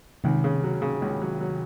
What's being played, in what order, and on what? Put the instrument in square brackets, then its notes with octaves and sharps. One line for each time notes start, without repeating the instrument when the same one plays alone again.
[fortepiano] C#2 [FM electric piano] C3 D#3
[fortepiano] C#3
F#3
C#3
C#2
F#3
F#3